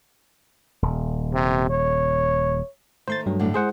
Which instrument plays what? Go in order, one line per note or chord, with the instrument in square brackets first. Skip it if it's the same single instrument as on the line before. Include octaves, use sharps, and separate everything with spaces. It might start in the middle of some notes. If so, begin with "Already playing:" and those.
[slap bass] D#1
[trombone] C3
C#5
[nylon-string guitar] D#3 A3 [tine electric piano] C5 C6 A6
[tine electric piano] G2 F#3
[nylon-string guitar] D2 A2 D3
[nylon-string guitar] G#3 [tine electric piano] G#4 C5 F#5